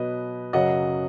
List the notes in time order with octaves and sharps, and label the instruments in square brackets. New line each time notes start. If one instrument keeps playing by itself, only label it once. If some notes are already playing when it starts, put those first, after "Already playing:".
Already playing: [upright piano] B2 F#3 B4 D#5
F#2 C#3 F#3 D#5 F#5